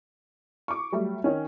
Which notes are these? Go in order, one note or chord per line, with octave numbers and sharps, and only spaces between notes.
C#6 D6
F#3 G3 A3
D#3 C#4